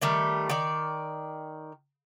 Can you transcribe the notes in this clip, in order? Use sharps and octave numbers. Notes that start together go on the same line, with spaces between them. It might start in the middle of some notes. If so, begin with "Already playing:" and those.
D#3 G3 A3
D#3 D5